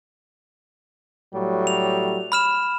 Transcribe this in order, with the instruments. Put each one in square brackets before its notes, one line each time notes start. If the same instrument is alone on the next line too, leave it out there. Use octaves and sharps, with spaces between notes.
[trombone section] A2 F#3 G3
[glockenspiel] F7
B5 F6 E7